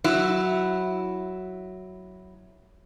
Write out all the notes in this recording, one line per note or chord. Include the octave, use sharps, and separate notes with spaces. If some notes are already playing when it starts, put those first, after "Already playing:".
F#3 E4